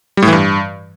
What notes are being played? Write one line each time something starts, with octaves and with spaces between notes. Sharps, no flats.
G3
A2
E3
G2